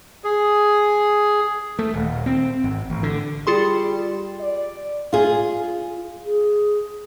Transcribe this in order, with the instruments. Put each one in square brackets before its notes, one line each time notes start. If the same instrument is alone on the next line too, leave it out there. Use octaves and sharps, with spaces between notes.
[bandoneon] G#4
[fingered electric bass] A3
D#1
C4
G#1
A1
D3
[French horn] G3 [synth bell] F4 G#4 C6
[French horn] D5
[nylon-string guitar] F4 G#4
[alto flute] G#4